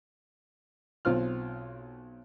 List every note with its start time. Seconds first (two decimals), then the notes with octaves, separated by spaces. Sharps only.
1.05 B1 C4 F4 F6